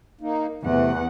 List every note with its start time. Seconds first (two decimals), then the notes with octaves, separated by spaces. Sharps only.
0.21 A#3 D#4
0.63 E2 C3 E3 A3 F#5